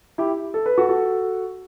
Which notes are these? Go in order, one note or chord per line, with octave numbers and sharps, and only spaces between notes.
E4 G4
A4
B4
F#4 A4
F#4 A4